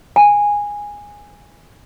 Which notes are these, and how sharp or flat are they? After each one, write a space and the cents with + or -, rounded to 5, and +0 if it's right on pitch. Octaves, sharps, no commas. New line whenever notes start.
G#5 -10